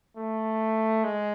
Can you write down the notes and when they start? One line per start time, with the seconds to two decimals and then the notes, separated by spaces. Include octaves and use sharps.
0.17 A3
1.04 G#3